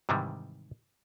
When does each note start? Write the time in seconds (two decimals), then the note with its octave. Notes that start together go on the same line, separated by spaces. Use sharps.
0.09 G#2 C3 D#3 E3 G3